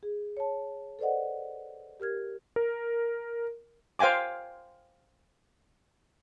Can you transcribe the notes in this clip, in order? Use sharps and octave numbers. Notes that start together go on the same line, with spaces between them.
G#4
C#5 A5
A4 B4 C5 D5 D#5 F#5
G4 A#4 F6 G#6
A#4
C5 F5 G5 G#5 D6